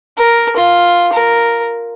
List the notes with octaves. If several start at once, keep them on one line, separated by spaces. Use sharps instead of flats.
A#4
F4
A#4